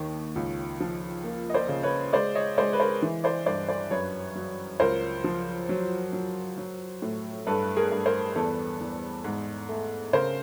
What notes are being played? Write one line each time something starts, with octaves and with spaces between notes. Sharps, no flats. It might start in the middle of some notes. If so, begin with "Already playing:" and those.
Already playing: D#2 D#3
C#2
F3
A#3
D#5
C5 D5
C#3
B4 C#5
G#3 C5 D5
C#5 D#5
G#3 C5 D5
B4
A#4 C5
E3
C5 D5
G2 C5 D5
C5 D5
F#2 B4 C#5
F#3
C#2 A#4 C5
F3
F#3
F#3
F#3
A2
G2 A4 B4
G#4 A#4
G2
A#4 C5
E2 A4 B4
E2
G#2
A3
C#3 A#4 C5